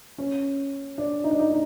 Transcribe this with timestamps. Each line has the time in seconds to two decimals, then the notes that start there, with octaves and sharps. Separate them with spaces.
0.18 C#4
0.98 D4
1.24 D#4
1.31 D4
1.39 D#4
1.50 D#4